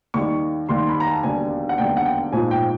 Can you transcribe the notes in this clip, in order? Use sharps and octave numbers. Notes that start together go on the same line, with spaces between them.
D#2 D#3 G3 C#6
D#2 D#3 G3 C6
B5
A#5
A5
E1 D#2 D3 G3 G#5
F#5
E1 D#2 D3 G3 G5
F#5
G5
A#1 G#2 F3 G#5
G5